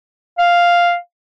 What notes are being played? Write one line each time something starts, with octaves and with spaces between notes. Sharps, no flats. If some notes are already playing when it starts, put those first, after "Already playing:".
F5